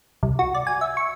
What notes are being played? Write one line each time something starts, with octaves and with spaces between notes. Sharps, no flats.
C2
F#4
D5
G#5
E5
C#6